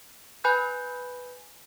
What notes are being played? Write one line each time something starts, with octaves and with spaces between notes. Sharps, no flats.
B4 G#5 B5 F#6 G6